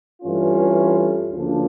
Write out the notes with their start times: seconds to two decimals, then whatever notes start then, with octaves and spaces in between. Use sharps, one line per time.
0.22 G2 E3 A3 C#4 F4
1.33 D2 C#3 F3 A#3 D4